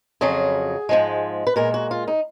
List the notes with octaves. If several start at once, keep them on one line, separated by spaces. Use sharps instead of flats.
F2 C#3 F#3 G#4
G#2 F3 G#3
B4
A#2 G#3 A#4
F#4
F4
D#4